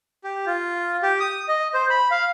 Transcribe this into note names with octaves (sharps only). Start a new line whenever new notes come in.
G4
F4
G4
D#6
D#5
C5
B5
F5